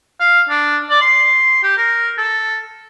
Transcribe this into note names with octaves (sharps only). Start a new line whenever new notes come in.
F5
D4
D5
C6
G4
A#4
A4